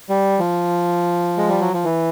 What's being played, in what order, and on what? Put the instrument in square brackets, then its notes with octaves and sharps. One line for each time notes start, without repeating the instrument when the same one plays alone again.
[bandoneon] G3
F3
G#3
G3
F#3
F3
E3